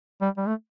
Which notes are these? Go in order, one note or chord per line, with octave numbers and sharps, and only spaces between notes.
G3
G3
A3